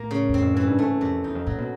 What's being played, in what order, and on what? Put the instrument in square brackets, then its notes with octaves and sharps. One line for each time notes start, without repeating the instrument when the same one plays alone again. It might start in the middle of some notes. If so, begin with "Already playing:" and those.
Already playing: [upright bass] A2 [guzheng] A#3
[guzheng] C#3
[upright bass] E2 [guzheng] C4
[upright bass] F2
[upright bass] F#2 [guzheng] E3
[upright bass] G2
[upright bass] G#2 [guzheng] A3
[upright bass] F2 [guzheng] C3
[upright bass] E2 [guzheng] D#4
[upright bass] F2
[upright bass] A#2 [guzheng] F#3
[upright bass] B2